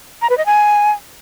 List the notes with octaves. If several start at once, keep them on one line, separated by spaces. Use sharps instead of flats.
A#5
B4
D#5
G#5